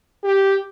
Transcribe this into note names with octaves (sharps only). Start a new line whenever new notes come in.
G4